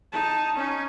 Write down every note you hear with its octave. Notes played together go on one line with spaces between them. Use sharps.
D#4 A5
C#4 D#4